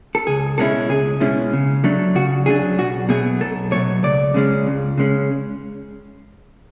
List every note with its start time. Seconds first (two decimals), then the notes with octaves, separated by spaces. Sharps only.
0.15 A4
0.27 C#2 G#4
0.58 B2 G#3 C#4 E4 A4
0.89 C#2 G#4
1.20 B2 G#3 C#4 E4
1.53 C#3
1.84 F#3 A3 D4
2.15 C#3 F#4
2.46 F#3 A3 D4 G#4
2.79 B1 F#4
3.09 B2 F#3 A3 G#4
3.41 B1 A4
3.72 B2 F#3 A3 C#5
4.03 C#2 D5
4.34 C#3 G#3 C#4
4.67 C#2
4.98 C#3 G#3 C#4